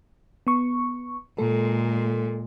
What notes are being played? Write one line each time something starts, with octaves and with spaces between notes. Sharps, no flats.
B3 C#6
A#2 G#3 A4